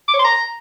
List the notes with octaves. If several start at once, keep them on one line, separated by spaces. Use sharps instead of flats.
D6
C#5
C6
A#5